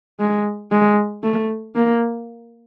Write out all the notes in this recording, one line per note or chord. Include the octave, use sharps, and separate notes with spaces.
G#3
G#3
A3
A#3